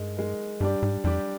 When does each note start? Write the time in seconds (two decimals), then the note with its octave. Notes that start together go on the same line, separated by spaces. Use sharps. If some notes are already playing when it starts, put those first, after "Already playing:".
Already playing: G2 G#3 D#4 A#4
0.17 G#3 D#4 A#4
0.60 G2 G3 D4 G4 D5
0.82 G#2
1.04 F2 G3 D4 G4 D5